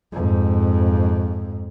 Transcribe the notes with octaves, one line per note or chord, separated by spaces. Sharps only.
F2 G#2